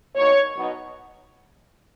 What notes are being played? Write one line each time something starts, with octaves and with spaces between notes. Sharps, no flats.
B2 A#3 D#4 C#5
B2 F#3 B3 D#4